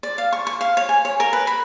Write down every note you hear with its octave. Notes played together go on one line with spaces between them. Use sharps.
D5
F5
C#6
C#6
F5
C#5
G#5
C#5
A#4
B4
B5